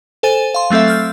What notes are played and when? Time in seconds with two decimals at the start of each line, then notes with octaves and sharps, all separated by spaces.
0.23 A4 C5 G#5 A6 D#7 E7
0.54 F5 C6
0.70 F#3 A3 C4 A4 E5
0.88 E6 F6 G6